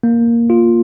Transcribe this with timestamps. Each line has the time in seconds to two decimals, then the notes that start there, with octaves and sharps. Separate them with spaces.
0.03 A#3
0.50 F4